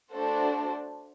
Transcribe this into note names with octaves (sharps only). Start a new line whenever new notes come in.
A3 D4 F#4 A4 C5